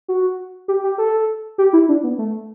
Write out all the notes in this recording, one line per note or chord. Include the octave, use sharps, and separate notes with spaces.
F#4
G4
G4
A4
G4
E4
D4
B3
A3